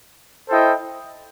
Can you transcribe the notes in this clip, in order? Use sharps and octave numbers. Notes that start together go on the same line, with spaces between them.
E4 A4 C5 D#5 G5